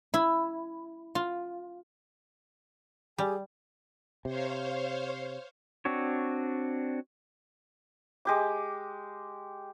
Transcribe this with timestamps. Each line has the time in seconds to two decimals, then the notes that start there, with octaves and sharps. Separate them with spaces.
0.14 E4
1.15 F4
3.18 G3 G4 G#4 G#5
4.25 C3 C5 C#5 F5
5.85 C4 D4 F#4 C#5
8.25 G#3 G4 D6